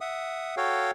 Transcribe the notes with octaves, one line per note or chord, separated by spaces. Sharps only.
E5 F#5 D#6
F#4 A4 C#5 F5 G5